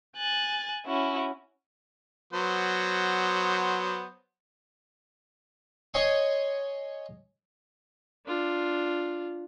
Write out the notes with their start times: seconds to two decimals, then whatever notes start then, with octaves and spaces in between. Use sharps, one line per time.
0.16 G#5 F#6 A6
0.86 C#4 E4 F#4
2.33 F#3 B3 C5
5.94 C#5 D#5 G#5 C6 C#6
8.26 D4 F4